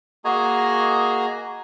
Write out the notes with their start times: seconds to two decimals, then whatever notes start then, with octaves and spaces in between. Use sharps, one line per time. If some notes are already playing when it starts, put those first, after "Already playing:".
0.25 A#3 F#4 G#4 D#5 G#5 A#5